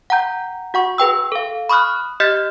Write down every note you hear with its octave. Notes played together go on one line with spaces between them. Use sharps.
F#5 G5 A#5 G6
F#4 F#5 C#6
G#4 B4 G5 E6
A4 F5
B5 C#6 D#6 F6 F#6
G4 D#5 F6 G6 A6 B6